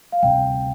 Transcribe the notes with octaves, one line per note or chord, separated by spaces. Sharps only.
F5
D2 C3 G3 G5